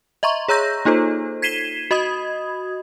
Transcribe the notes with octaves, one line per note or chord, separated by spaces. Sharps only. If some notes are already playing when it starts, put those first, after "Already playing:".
D#5 E5 A#5 C6 C#6
G#4 C#5 A#5 E6 G6 A#6
A#3 D#4 F4 A4 C5
G#6 B6 C7 D#7 E7 G7
F#4 D#5 B5 D#6 G#6